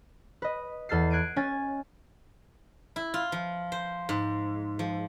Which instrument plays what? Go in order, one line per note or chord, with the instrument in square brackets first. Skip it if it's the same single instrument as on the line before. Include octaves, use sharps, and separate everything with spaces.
[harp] B4 D#5
E2 A4 F6 A6 C7
F#6 G#6 C7 D7 D#7
C#4 G#5 F6 A6
[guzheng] E4
F4
F3
C5
G#2
F3